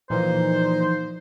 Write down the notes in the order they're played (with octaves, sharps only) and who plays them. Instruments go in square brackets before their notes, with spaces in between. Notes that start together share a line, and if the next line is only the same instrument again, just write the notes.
[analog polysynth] A#2 D#4 [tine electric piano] E3 F3 [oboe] C5